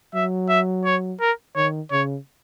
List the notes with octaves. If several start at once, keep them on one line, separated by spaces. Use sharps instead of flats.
F#3 E5
E5
C#5
A#4
D#3 C#5
C#3 C#5